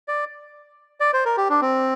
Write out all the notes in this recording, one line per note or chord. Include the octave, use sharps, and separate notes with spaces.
D5
D5
C5
A#4
G4
D4
C4